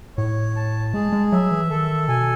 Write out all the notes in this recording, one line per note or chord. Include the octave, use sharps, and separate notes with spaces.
A2 C#5
A5
G#3 G#4
G#3
F#3 E5
E3
D#3 A4
B2 G#5